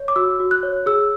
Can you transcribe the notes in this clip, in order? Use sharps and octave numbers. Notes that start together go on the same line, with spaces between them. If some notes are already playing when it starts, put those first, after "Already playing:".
Already playing: C#5
D6
F#4 E6
F#4
F#6
C#5
G#4 E6